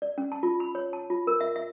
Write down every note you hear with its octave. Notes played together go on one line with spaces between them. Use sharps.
D5
C#4
A5
F4
B5
C#5
A5
F4
A#4
E5
E5